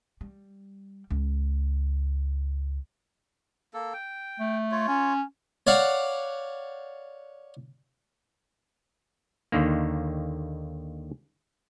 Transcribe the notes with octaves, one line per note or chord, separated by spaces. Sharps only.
G3
C#2
A#3 A4
G5
A3
F4 C#5
C#4
C#5 D5 F5 F#5
D#2 D3 D#3 A#3